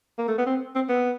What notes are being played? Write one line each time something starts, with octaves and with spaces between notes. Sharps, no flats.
A#3
A3
B3
C4
C4
B3